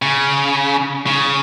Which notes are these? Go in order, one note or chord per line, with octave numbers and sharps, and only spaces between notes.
C#3
C#3